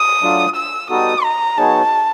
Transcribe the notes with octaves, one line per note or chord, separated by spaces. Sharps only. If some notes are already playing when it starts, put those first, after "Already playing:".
Already playing: D#6
F#3 A3 D4 F4
E6
G3 B3 D#4 F#4 A4 D#6
A#5
F#3 B3 D#4 G#4 C#5 A5